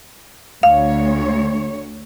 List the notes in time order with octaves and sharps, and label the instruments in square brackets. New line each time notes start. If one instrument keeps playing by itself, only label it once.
[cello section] D2 C#5 [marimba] F5